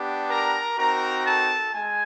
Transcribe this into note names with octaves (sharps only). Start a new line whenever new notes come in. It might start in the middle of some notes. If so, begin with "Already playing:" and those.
Already playing: B3 D4 G4
A#4 A#5
C4 D#4 F#4 A#4 A#5
A4 A5
G#3 G#5